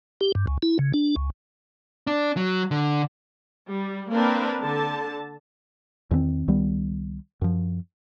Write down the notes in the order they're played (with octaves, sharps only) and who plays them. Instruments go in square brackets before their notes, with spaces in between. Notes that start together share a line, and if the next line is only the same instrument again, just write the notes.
[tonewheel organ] G4
G2
C#2
E4
C#3
D4
C#2
[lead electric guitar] D4
F#3
D3
[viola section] G3
A#3 C4 D4 A#4 B4
D3 A5
[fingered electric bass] E2 D#3 A#3 C4
C#2 D#3 G3 B3
F#2 F3